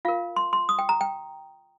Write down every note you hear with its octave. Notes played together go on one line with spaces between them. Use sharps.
F4 A#4 F5
C6
C6
D#6
G5
A#5
G5